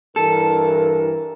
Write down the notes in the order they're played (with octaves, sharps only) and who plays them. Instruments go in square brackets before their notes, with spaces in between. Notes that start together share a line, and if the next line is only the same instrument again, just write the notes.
[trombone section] G2 E3 A#4 [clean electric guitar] A4